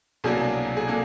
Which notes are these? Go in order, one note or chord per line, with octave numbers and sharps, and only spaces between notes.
C2 B2 F#3 A#3 D4 G#4
G#4
A#3 D4 A4